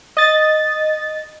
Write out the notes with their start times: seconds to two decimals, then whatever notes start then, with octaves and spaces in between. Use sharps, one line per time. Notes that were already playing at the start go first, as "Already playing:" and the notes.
0.17 D#5 A6